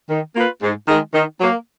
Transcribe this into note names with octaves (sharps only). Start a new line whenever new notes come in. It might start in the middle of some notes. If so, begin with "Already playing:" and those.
D#3
A#3 F4 B4
G#2
D#3 G#3
D#3
F#3 A#3